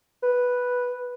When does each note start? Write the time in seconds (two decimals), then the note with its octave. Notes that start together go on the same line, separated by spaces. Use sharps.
0.23 B4